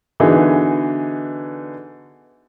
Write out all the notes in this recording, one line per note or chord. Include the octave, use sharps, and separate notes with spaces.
D3 E3 B3 D#4 F#4 G#4